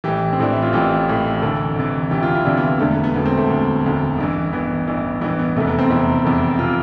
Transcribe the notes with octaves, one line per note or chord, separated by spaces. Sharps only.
A1 A2 E3 G4
C4
A1 A2 E3 D4
E4
F4
A1 A2 E3 G4
A1 A2 E3
D2 C3 E3 A4
D2 C3 E3
D2 C3 E3 G4
F4
E4
D2 C3 E3 D4
B3
B3
E1 D2 D3 A3
B3
B3
E1 D2 D3 B3
C4
A3
E1 D2 D3
E1 D2 D3
A1 G2 E3
A1 G2 E3 B3
A1 G2 E3
A1 G2 E3 B3
B3
F1 E2 C3 A3
B3
C4
F1 E2 C3 E4
F1 E2 C3
C3 F4